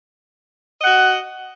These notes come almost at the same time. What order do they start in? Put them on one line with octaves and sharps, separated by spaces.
D#5 F#5 F#4